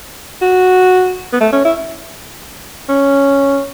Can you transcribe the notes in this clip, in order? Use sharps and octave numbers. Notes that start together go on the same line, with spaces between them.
F#4
B3
A3
C#4
E4
C#4